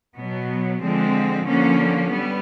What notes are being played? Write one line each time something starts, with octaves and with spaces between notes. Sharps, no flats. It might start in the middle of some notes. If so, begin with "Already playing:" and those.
B2 F#3 B3
D3 F3 G#3 C4
D3 F3 A#3 C#4
G3 B3